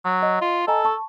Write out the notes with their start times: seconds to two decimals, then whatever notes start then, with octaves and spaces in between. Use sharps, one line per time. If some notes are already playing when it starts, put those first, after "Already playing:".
0.06 F#3
0.22 D#5
0.42 F4
0.68 A4 D#5 G#5 A#5
0.85 A5 C#6